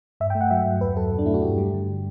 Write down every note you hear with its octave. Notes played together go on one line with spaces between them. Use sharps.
G2 E5
G5
A3
F#5
F#3 E5
G2
E2 B4
F#3 A4
B2
D4
A3 E4
F#4
G2 G4
G3
D3